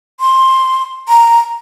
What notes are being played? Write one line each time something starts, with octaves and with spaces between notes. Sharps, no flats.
C6
A#5